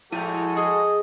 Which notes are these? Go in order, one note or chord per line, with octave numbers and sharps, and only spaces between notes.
A2 F3 G#3 E4 F#4 A4 D#7
G#4 D#5